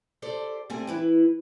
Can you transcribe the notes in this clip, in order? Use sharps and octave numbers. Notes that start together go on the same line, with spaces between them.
G4 A4 C5 D5
G3 A3 C4 G#5
E3 E4 B4